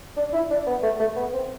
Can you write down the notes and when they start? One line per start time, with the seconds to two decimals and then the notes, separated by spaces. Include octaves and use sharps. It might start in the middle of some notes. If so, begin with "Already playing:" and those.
0.17 D4
0.33 E4
0.50 D4
0.67 B3
0.82 A3
1.00 A3
1.16 B3
1.33 C4